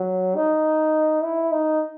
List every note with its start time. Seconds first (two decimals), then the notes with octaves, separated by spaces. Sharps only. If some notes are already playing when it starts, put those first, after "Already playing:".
Already playing: F#3
0.36 D#4
1.23 E4
1.52 D#4